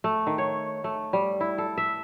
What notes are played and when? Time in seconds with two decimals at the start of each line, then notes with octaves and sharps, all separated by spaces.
0.04 A3
0.27 D#3
0.38 C#5
0.84 A3
1.13 G3
1.41 E4
1.58 A4
1.78 E5